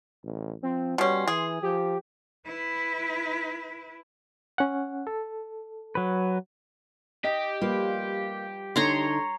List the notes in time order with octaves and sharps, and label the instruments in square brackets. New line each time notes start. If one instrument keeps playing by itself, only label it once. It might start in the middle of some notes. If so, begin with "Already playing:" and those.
[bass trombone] A1
[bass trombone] F3 [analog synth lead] C4
[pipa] B2 C#4 [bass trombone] G3 [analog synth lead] C6
[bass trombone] E3 [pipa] G#4
[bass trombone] F3 [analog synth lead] G4
[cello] E4 B4
[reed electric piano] C#4 F#5
A4
[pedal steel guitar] F#3 B4
[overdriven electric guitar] G4 [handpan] D#5
[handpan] G3 F4 B4 [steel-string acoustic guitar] A#3
[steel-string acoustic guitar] D3 D#4 [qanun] C#5 A#5 C6